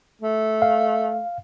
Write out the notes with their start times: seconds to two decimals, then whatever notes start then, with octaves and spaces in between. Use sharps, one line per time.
0.21 A3
0.62 F5